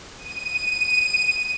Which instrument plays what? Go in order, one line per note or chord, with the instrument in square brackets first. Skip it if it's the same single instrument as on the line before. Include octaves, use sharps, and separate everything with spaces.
[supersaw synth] D#7